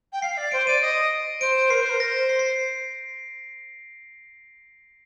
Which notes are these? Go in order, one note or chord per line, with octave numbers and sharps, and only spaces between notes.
G5
F5 C7
D5
C5 D7
D5 D#7
D#5
C5 D7
A#4 C7
C5
A#4
C5 A#6
C7
C7